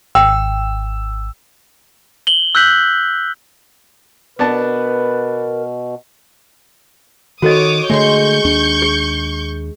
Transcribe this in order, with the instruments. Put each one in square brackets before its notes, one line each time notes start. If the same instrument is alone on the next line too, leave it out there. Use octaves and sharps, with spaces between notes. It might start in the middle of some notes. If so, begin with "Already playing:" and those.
[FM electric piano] G#1 [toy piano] G5 [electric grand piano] E6
[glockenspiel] F#7 G7
E6 F#6 G6 B6 F#7
[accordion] B2 [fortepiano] B3 D4 A5 [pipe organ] A#4 [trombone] B4
[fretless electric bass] D#3 [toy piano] F#4 A4 D#5 [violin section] C#5 D6 D#6 [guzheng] F#5
[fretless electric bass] D3 A3 [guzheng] G#3 C6 [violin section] C#6 G6
[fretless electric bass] D#2 D4
[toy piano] G#4